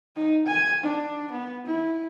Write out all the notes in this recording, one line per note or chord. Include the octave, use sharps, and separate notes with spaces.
D#4
G#5
D4
B3
E4